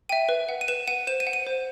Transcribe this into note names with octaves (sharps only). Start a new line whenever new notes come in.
E5 G5 D#7
B4
F#5
D#7
B4 E7
F#5 D#7
C5 E7
D#7
F#5
D#7
C5